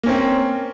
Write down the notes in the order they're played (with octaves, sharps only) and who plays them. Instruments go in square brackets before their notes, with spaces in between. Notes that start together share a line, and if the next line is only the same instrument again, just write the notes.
[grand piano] A#3
C#4
C4